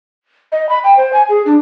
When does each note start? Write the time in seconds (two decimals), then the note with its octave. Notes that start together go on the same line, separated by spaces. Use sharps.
0.52 D#5
0.69 B5
0.84 G5
0.97 C5
1.13 G#5
1.29 G#4
1.46 D4